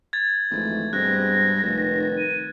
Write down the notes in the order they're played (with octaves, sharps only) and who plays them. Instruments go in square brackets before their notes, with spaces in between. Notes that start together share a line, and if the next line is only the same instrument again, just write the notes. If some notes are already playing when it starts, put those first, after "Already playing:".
[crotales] G#6 A6
[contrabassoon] G#1 [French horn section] E3 F3 A3
[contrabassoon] G2 [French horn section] B2 G#3 C4 [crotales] F#6 [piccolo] A#6
[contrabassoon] F1 [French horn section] D#3 B4
[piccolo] D#7